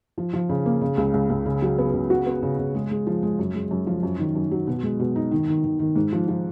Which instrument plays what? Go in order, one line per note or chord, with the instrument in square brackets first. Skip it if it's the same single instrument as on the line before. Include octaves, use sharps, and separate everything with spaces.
[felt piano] F3
F3
C#3
A#3
C#3
C#2
C#2
C#2
C#3
F#3
B3
C#3
F#4
B3
C#3
C#3
G#3
G#3
F3
G#3
F#2
G#3
F#2
F3
F#2
D#3
F#2
F#3
B2
G#3
B2
D#4
D#3
D#3
D#3
D#3
G#2
F3
F3